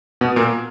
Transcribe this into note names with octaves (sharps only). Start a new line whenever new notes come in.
B2 B3
A#2 A#3